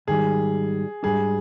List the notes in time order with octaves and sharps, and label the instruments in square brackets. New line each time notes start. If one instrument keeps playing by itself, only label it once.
[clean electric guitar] G#2 D#3 G3 [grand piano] G#4
[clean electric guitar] G#2 G3 D4 [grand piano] G#4